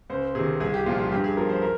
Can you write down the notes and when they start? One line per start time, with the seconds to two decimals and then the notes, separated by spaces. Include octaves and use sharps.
0.10 C#2 C5
0.35 C3 D#3 G#4
0.60 C2 G#4
0.74 G4
0.86 A#2 F3 F4
0.98 F4
1.12 G2 G4
1.24 G#4
1.37 F3 A#4
1.49 C5
1.62 A#4